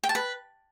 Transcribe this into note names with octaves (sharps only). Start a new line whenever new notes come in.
G5
A5
B4